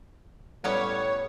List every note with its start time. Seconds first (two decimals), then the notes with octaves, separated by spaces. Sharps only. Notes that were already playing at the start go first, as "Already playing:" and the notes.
0.64 A2 G3 B3 C#4 C#5